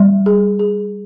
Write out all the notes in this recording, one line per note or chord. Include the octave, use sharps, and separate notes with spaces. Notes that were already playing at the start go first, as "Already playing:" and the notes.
Already playing: G3
G#4
G#4